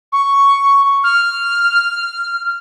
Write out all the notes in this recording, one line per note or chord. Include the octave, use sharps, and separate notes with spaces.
C#6
F6